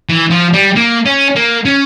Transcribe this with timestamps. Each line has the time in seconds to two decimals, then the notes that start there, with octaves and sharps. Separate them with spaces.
0.09 E3
0.31 F3
0.53 G3
0.76 A#3
1.05 C#4
1.36 A#3
1.65 C#4